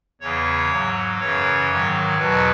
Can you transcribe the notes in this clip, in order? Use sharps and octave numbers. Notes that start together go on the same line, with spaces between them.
E2 C#3 E3 C#5
G#2 F#3
F#2 C#3 E3 C#5
G#2 D#3 F#3
E2 B2 F#3 B4